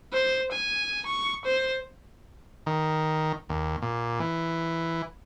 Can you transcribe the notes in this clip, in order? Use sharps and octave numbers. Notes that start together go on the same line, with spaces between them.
C5
G#5
C#6
C5
D#3
D#2
A#2
E3